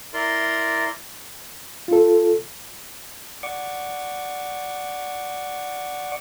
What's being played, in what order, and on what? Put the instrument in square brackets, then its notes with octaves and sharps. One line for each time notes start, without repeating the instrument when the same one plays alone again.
[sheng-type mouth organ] E4 A#4 D5 C6
[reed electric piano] F4 A4
[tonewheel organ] D5 F#5 C#6 D6